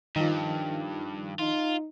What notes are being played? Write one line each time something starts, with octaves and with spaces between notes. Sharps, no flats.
G2 D#3 F3
D#4 F4